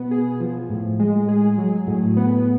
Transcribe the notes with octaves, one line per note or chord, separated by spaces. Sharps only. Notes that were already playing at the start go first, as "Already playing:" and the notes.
Already playing: B2 B3
G#4
F3
A2
G#3
G#4
F#3
A2
B3